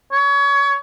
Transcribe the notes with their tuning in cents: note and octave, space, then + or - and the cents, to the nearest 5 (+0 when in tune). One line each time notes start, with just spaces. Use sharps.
C#5 +25